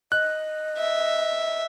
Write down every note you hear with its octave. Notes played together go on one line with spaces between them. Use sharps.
D#5 F#6
E5